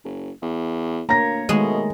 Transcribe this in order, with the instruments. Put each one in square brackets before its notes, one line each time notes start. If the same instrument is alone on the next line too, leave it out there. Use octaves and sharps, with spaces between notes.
[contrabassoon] F#1
E2
[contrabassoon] D2 [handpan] A#3 C#5 [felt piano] A#5 A#6
[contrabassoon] B2 [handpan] D#3 A3 [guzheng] G#3